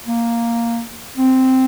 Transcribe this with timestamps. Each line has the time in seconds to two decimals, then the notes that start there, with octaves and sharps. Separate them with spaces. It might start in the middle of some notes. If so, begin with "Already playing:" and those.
0.06 A#3
1.17 C4